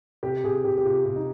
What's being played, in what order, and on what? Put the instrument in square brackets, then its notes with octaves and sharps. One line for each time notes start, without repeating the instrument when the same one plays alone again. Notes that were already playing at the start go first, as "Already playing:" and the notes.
[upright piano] C3 [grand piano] G4
[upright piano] C3 [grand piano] G#4
[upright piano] C3 [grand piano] G4
[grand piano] G4
[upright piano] C3 [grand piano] F4
[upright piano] C3
[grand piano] D#4